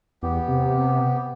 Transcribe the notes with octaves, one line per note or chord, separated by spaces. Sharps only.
E2 B3 G4
C3